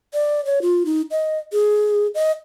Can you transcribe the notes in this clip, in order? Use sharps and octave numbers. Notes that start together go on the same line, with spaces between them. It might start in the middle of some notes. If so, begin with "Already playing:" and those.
D5
C#5
F4
D#4
D#5
G#4
D#5